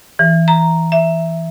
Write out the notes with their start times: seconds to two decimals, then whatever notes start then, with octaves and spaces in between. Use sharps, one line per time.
0.19 E3
0.48 A#5
0.92 E5